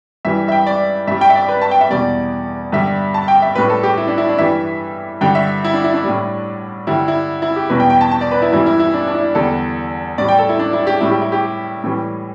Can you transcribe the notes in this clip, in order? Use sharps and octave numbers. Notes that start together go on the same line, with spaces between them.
G2 E3 G3 E5
E5
G5
D5
G2 G3 E5
G5
E5
D5
B4
A5
G5
E5
E2 B2 G3 D5
G2 D3 G3 E5
A5
G5
E5
A2 G3 B4
A4
G4
E4
D4
E4
D4
G2 E3 G3 E5
G2 D3 G3 G5
E5
E4
D4
E4
D4
A2 G3
G2 D3 G3 E4
E4
E4
G4
E2 B2 G3 B4
G5
G5
A5
A5
D5
B4
E4
G2 E3 G3 E4
E4
E4
D4
D4
E4
E2 D3 G3 A4
A2 G3 D5
G5
A4
E4
D4
E4
G4
A2 G3 E4
G4
E4
G4
A2 E3 G3